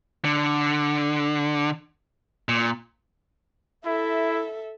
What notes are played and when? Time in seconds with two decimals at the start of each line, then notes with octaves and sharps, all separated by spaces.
0.25 D3
2.49 A#2
3.85 E4 A4 E5